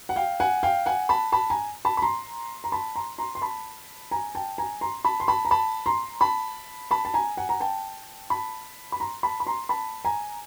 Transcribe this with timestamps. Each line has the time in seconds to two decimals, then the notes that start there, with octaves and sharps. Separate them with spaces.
0.09 F#5
0.16 F5 G5
0.40 F#5 G#5
0.63 F5 G5
0.86 F#5 G#5
1.09 A5 B5
1.32 A5 B5
1.50 G#5 A#5
1.85 A5 B5
1.97 B5
2.02 A#5 C6
2.64 A#5
2.72 A5 B5
2.95 A#5 C6
3.18 A#5 C6
3.35 C6
3.42 A5 B5
4.11 G#5 A#5
4.35 G5 A5
4.58 G#5 A#5
4.81 A#5 C6
5.05 A5 B5
5.20 C6
5.28 A5 B5
5.45 A#5
5.51 A5 B5
5.86 A#5 C6
6.21 A5 B5
6.91 A5 B5
7.05 A5
7.14 G#5 A#5
7.37 F#5 G#5
7.49 A#5
7.60 G5 A5
8.30 A5 B5
8.92 B5
9.00 A#5 C6
9.23 A5 B5
9.40 B5
9.46 A#5 C6
9.69 A5 B5
10.05 G#5 A#5